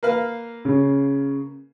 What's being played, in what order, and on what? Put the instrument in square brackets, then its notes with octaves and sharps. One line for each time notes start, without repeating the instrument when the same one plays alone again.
[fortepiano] A#3 B4 F5
[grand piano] C#3